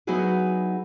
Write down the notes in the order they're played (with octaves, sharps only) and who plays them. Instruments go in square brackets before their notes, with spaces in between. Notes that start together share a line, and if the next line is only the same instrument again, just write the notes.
[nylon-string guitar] F#3 B3 D#4 E4 F#4 G#4